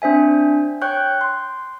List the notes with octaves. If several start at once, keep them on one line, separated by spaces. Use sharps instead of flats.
C4 D4 C5 E5 G#5
C#5 G5 C#6 F#6 G6
C6